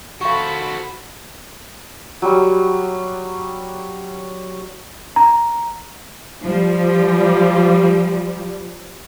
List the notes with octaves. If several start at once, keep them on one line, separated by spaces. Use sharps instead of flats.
F#4 A4 C5 F5 B5 C#6
F#3 G3
A#5
F3 G3